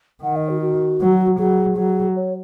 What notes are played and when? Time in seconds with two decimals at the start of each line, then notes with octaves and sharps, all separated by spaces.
0.23 D#3 F#5
0.36 D#5
0.49 F#4
0.61 F#4
1.00 F#3
1.38 F#3 G#4
1.77 F#3
2.16 C#5